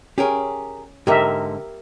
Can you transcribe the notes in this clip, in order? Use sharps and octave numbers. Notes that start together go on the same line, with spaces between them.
C#4 G4 G#4 A#4
G#2 D3 G4 A#4 E5